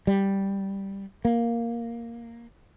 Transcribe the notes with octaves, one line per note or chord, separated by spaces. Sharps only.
G3
A#3